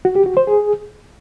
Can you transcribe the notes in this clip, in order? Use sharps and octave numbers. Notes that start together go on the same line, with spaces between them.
F#4
G4
F#4
C5
G#4